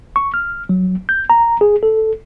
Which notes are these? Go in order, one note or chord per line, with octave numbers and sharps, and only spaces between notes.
C#6
F6
F#3
G6
A#5
G#4
A4